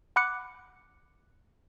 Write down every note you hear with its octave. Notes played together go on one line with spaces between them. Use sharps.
F#5 B5 D6 F#6 C#7